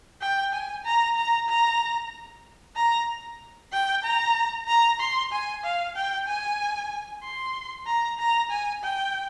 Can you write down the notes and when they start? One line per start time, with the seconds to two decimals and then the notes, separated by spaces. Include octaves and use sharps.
0.21 G5
0.53 G#5
0.85 A#5
1.17 A#5
1.48 A#5
2.76 A#5
3.73 G5
4.04 A#5
4.68 A#5
5.00 C6
5.32 G#5
5.64 F5
5.96 G5
6.27 G#5
7.23 C6
7.86 A#5
8.19 A#5
8.50 G#5
8.83 G5